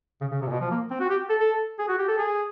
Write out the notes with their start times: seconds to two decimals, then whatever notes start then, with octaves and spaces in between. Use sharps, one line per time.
0.21 C#3
0.32 C#3
0.41 C3
0.47 A#2
0.51 B2
0.61 F3
0.71 A#3
0.91 C4
1.00 F#4
1.10 G4
1.29 A4
1.40 A4
1.79 G#4
1.89 F#4
1.98 G4
2.09 A4
2.18 G#4